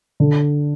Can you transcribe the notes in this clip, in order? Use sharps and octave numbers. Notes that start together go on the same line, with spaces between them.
D3